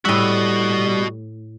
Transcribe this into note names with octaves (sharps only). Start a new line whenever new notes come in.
A2 G3 F#4 D#5 E5